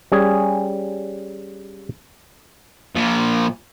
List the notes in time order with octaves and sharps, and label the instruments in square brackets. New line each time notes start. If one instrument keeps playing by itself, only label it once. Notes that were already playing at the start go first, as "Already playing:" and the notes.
[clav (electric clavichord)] G3 C#4 G#4
[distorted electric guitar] A#2 F3